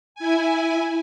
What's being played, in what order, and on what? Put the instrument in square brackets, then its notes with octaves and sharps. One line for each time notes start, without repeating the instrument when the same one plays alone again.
[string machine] E4 G#5